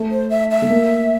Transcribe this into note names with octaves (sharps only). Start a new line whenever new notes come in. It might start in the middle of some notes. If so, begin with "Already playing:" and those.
Already playing: A3
C5
E5
E5
A3
A#3